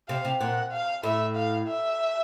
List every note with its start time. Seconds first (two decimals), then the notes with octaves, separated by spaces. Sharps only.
0.09 C3 F5
0.25 C3
0.41 A#2 F#5
0.72 F5
1.03 A2 E5
1.36 F5
1.68 E5